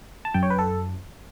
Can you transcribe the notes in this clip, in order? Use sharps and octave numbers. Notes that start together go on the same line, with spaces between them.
A5
F#2 G5
C#5
B4
A4